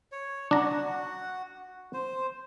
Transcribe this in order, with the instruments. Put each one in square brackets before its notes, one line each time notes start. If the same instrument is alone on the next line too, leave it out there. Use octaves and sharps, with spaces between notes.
[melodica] C#5
[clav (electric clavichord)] D4 A#5 [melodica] F#4 F#5
[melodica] C5